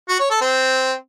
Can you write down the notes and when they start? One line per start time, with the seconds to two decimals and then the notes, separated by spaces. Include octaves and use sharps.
0.09 F#4
0.20 C#5
0.30 A4
0.41 C4